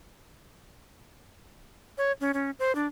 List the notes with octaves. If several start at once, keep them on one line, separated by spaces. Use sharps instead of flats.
C#5
C#4
C#4
C5
D4